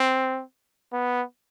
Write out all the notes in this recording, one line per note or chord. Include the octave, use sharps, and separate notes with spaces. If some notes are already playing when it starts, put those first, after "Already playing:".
Already playing: C4
B3